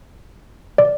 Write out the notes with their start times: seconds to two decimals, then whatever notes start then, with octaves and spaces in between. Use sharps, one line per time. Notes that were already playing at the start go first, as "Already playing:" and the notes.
0.78 D5